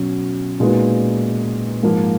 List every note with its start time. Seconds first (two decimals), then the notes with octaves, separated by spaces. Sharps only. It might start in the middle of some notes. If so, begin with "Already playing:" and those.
Already playing: B2 F#3 C#4 F#4
0.60 A#2 G#3 B3 D#4 F#4
1.83 G#2 F3 A#3